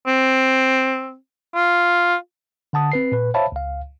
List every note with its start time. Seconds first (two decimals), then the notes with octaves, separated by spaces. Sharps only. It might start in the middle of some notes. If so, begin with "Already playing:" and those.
0.07 C4
1.55 F4
2.73 D3 F#5 A5 D#6
2.92 C4 B4 C7
3.12 A#2 B4
3.34 C5 C#5 E5 F5 A5 B5
3.52 C#2 F5